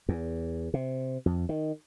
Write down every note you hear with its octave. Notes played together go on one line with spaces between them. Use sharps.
E2
C3
F2
D#3